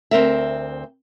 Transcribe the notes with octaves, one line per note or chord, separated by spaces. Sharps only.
D2 C4 A#4 E5